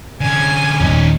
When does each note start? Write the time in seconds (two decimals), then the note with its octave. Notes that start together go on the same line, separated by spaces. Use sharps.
0.21 D3 C#4 G#5
0.80 D#1 D#2 D#3 C#4 D#4